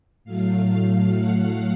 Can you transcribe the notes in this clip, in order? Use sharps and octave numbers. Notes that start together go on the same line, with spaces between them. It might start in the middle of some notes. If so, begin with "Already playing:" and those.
A2 F#3 A3 F5
F5
F#5